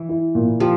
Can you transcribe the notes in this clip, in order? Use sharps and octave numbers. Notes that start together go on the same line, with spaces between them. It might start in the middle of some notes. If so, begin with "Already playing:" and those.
Already playing: E3
E4
A#2
F3 G4